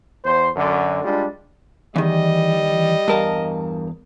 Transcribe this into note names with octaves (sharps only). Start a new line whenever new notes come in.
E2 C5
F#2 D3
G3 G#3 D4 F4
E2 D#3 E3 G3 D#5
E2 G2 A#4 F5 A5